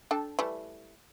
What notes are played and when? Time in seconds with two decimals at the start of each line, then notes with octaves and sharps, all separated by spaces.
0.11 D4 A4 G5
0.39 E3 G3 A3